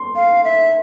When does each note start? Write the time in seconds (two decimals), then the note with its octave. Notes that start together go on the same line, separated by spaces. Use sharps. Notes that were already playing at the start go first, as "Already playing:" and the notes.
Already playing: C6
0.16 F5
0.44 E5